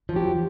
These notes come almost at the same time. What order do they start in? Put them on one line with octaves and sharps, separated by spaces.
F3 F#3 G4